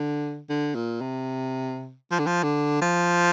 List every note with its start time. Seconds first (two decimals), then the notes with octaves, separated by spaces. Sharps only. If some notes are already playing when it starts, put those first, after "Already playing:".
Already playing: D3
0.49 D3
0.75 A#2
1.01 C3
2.11 F3
2.19 D3
2.26 F3
2.43 D3
2.82 F3